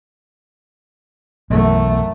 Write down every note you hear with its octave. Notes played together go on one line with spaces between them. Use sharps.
B1 F#2 E3 A3